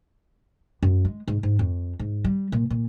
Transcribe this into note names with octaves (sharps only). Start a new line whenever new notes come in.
F#2
G#3
G#2
G#2
F2
G#2
G3
A#2
A#2